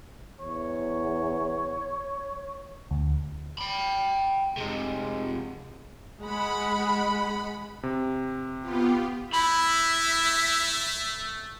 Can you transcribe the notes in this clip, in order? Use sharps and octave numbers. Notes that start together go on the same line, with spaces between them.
E2 C#5
D2
G5 B5
F2 C3 G#3
G#3 F#5 B5
C3
B3 F4 G4
A3 E4 E5 B5